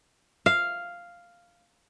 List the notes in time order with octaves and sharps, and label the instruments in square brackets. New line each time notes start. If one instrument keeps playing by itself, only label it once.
[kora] F5